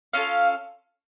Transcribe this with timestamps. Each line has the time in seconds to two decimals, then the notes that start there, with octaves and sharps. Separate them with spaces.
0.13 C#4 F4 A4 F5